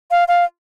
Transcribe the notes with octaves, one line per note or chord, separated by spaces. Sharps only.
F5
F5